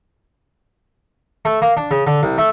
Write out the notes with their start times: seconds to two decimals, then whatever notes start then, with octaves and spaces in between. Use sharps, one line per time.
1.45 A3
1.62 A#3
1.77 D4
1.91 C#3
2.07 D3
2.23 C2
2.38 A3